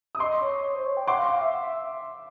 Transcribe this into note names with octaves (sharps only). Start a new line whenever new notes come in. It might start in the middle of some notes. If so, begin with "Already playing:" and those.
D#6
D#5 C6 D6
C#5
C#5
C5
C#5
G5
F#5 C6 D6
F5
F5
E5